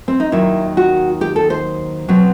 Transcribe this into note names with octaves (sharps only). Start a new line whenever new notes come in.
C4
D#4
D#2 D#3 F#3 E4
F#4
G4
A4
C5
B2 F#3 C4